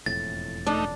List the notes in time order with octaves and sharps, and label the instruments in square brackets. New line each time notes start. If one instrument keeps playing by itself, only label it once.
[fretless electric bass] E1 F2 A2 [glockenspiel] A6
[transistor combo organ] A3 D#4 [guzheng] D4